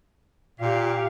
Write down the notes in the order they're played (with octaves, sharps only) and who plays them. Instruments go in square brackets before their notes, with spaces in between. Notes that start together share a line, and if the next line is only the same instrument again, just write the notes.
[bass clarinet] A#2 [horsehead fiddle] G4 F5